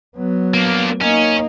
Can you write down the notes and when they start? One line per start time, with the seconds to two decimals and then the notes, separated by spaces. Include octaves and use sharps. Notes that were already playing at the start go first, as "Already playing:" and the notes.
0.16 F#3 B3
0.54 A#3 D4
1.01 A#3 C#4 D#4